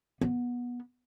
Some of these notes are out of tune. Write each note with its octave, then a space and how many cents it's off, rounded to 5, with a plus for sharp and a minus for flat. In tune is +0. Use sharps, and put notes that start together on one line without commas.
B3 -20